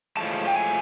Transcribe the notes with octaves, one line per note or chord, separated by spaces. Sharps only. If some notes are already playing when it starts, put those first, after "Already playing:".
A2 F3 G#3 A5
G5
G#5